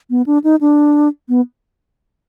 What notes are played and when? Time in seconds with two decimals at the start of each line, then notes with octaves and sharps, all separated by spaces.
0.10 B3
0.26 D4
0.44 D#4
0.61 D4
1.29 B3